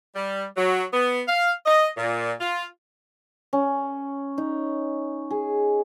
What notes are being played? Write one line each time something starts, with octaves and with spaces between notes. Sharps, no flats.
G3
F#3
B3
F5
D#5
A#2
F4
C#4
D#4
G#4